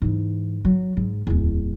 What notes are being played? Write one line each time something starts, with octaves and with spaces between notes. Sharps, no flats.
G#2 E3
F#3
G#2
D1 E2